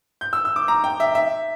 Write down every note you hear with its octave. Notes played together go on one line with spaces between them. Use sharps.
G6
E6
E6
D6
A#5
G5
E5
E5